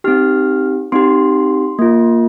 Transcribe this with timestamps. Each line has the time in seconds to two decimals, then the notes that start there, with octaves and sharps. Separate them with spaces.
0.04 C4 D#4 G4 F6
0.92 C4 D#4 G4 C6
1.79 A#3 F4